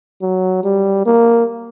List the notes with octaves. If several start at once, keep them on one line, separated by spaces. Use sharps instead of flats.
F#3
G3
A#3